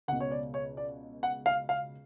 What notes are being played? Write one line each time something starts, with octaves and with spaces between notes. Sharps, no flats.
C#2 B2 F#5
C#5
D5
C#5
D5
F#5
F5
F5